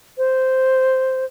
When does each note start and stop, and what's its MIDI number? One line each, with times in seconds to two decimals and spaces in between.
0.18 1.25 72